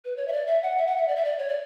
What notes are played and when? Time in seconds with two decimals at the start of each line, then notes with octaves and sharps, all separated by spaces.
0.05 B4
0.17 C#5
0.28 E5
0.32 D5
0.47 E5
0.63 F#5
0.78 E5
0.87 F#5
0.97 E5
1.08 D5
1.16 E5
1.25 D5
1.39 C#5
1.49 D5